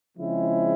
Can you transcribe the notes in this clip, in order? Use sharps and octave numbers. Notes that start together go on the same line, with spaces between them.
C#3 F3 G#3 C4 E4